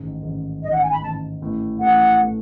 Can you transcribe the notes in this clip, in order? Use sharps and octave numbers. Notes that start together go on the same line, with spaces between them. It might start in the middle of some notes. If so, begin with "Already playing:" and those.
Already playing: A1 G#2 D#3
A1 G#2 D#3
A1 G#2 D#3 D#5
F#5
G#5
B5
A1 G#2 D#3 A5
A1 A2 E3 A3
A1 A2 E3 A3 F#5
A2 E3 A3